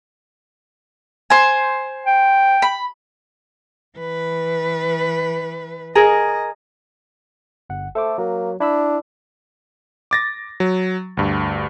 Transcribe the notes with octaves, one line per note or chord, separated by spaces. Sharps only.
C5 G#5
G5
B5
E3 B4
G#4 A#4 D#5
G1 F#5
A3 A4 C5 D6
F#3 A#3
D4 E4 B5 E6
D6 A6 A#6
F#3
D2 G2